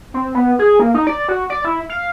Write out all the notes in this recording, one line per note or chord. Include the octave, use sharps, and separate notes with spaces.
C4
B3
G#4
A#3
D#4
D5
F#4
D5
E4
F5